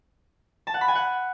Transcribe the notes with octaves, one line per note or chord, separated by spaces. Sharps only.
A5
F#5
B5
G#5
F#5